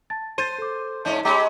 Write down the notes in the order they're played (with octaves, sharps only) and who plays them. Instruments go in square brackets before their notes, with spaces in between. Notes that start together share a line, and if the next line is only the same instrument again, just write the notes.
[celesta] A5 A6
[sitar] C5 [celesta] A5 A6 D#7
[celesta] A4 D6
[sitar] G#2 C#4 D4 [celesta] D#5 G6
[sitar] G#3 C#4 [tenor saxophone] G4 [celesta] A#5 B5